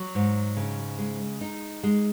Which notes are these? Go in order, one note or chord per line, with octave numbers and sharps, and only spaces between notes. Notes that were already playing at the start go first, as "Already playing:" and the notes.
Already playing: F#3
G#2
C#3
G#3
D#4
G#3